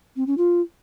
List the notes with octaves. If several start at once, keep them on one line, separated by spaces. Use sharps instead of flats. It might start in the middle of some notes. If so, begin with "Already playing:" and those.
C4
C#4
F4